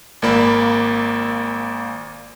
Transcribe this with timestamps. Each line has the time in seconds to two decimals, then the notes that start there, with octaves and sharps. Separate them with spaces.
0.22 G#1 A#2 A#3 D5 B5